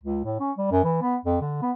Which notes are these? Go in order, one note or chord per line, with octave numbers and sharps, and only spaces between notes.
C#2
A2
C#4
G3
F#2
E3
B3
F2
D3
B3